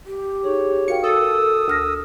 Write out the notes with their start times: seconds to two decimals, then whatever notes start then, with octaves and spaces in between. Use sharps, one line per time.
0.06 G4
0.44 D#4 G#4 C#5
0.88 F#4 A#4 F5 G5 C#7
1.04 A4 D#6 E6
1.68 D2 F6 A#6